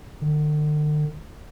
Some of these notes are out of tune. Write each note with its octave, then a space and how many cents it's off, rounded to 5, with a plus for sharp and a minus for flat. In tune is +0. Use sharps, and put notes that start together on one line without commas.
D3 +45